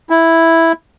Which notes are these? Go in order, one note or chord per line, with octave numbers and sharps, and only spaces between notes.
E4